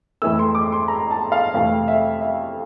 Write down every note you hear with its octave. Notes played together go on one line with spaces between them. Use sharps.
F2 E3 A3 E6
C6
D6
C6
A#5
A5
F5
F2 C3 E3 A3 F5
E5
E5